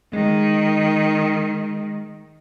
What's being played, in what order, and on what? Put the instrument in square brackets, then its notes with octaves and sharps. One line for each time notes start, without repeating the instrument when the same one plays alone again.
[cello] D#3 [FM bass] G#3